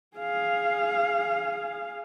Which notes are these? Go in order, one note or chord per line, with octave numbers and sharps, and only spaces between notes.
G#4 F5